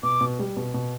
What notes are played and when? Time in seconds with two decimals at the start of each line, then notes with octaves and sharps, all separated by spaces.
0.03 B2 D6
0.21 B2
0.39 G3
0.57 B2
0.74 B2